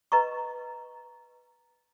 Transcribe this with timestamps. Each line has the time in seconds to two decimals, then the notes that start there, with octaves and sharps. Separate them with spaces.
0.12 B4 D#5 A#5 C#6